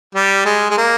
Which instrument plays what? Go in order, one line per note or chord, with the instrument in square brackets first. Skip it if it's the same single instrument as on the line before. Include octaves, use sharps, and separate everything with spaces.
[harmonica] G3
G#3
G#3
A#3